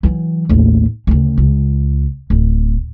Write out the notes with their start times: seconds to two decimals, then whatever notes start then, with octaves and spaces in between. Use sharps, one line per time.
0.03 E3 F#3
0.49 A1 D#2
1.07 D2 C#3
1.37 C#2
2.30 D1